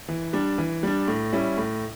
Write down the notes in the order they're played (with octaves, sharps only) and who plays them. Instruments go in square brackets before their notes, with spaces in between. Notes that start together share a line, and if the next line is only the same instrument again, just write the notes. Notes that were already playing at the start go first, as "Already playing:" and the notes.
[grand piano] E3
G3 D4
E3
G3 D4
A2
G3 C#4 E4
A2